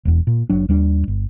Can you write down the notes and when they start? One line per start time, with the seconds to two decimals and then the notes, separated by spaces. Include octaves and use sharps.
0.05 E1 E2
0.27 A#2
0.50 F#1 F#3 D4
0.69 D#2 G3 D4
1.08 G1